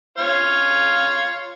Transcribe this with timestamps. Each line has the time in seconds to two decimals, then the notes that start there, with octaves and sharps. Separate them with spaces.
0.18 F4 C#5 F5